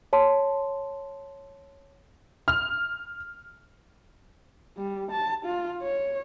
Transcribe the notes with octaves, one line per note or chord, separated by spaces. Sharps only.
C#5 A5 C6
F6
G3
A5
F4
C#5